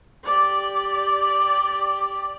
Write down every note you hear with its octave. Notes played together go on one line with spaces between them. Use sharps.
G4 D5